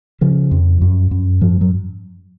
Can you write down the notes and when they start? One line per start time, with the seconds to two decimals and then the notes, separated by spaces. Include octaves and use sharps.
0.21 C#3 F3
0.51 F2
0.82 F#2
1.11 F#2
1.41 G#2 F3
1.61 F#3